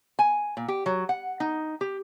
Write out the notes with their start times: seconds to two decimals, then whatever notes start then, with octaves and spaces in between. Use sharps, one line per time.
0.19 G#5
0.57 A#2
0.68 G4
0.86 F#3
1.09 F#5
1.40 D#4
1.81 G4